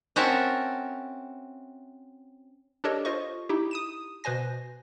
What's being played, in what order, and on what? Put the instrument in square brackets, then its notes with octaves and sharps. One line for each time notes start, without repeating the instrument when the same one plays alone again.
[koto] C4 C#4 F#4 A#4 E5 A5
[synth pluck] D4 G4 A4 A#4 C#5 D#5
F4 C5 D#5 C#6
D#4 E4 G4
D#6 D#7 E7
B2 B4 C5 G#5 A#6